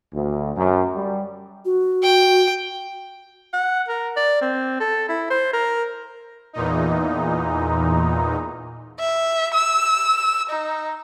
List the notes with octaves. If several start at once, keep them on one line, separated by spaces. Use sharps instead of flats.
D2
F#2
G3
F#4
G5
F#5
A#4
D5
C4
A4
E4
C5
A#4
E2 A#2 D#4
E5
E6
D#4